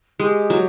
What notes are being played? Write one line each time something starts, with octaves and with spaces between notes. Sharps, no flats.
G#3 G4
F#3